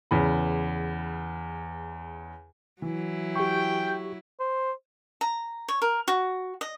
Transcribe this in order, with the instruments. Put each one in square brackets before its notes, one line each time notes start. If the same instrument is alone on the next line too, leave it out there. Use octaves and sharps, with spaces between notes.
[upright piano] E2 C#3 B5
[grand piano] E3 [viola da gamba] F#3 E4
[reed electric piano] G4 C#6 [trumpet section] G5
[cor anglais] C5
[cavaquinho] A#5
C#5
A#4
F#4
D#5